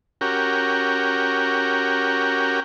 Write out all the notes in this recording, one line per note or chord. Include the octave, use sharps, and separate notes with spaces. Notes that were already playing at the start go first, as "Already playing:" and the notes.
C#4 F#4 G4 A#4